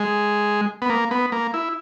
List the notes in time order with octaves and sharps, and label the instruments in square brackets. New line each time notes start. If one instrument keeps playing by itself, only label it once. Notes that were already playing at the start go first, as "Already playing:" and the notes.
Already playing: [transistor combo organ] G#3
B3
A#3
B3
A#3
E4